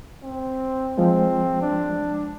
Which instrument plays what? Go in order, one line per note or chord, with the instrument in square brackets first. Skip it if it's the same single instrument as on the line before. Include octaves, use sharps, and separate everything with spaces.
[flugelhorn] C4
[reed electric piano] F3 G#3 [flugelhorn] C4
[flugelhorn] D4